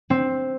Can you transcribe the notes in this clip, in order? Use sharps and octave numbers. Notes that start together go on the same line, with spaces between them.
C4